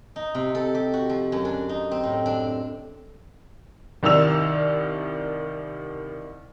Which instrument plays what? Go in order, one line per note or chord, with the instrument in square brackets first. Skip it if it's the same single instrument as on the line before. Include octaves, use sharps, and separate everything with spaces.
[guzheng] D#4
C3
A4
G4
F#4
F3
F#2
D4
D#4
C4
A2
D4
[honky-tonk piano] C2 D#3 D5 E6 F7